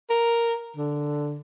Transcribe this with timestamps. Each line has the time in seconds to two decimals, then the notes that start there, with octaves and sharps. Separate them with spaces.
0.10 A#4
0.76 D3